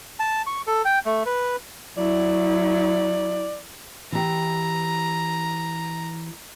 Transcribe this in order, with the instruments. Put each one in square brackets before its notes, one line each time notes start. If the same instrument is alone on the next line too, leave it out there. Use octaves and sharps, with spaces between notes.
[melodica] A5
C#6
A4
G5
A3
B4
[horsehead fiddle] F#3 E4 [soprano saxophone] D5
[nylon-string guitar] E3 G4 [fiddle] A#5